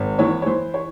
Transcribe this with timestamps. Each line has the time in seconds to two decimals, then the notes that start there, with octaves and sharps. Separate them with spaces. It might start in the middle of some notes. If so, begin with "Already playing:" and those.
Already playing: G#1
0.19 E3 C#5
0.42 C#5
0.46 E3 C5
0.74 C#5